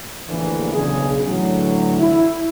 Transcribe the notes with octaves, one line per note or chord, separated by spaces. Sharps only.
A#1 E2 A2 D3 E3 A#3
B1 C#3 D4 G#4
A2 D3 E3 F#3
E4